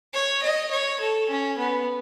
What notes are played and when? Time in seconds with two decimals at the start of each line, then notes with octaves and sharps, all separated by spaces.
0.13 C#5
0.43 D#5
0.71 C#5
1.01 A4
1.30 C#4
1.58 B3